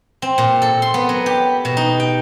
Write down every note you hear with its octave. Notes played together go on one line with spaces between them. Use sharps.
C4
A#2
A4
C6
B3
F#3
G4
B2
D#4
G5